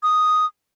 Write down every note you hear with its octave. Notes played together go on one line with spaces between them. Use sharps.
D#6